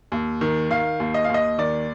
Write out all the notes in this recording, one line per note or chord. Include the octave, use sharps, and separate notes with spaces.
D#2
D#3
D#3 F5
D#2
D#5
D#2 F5
D#5
D#3 D5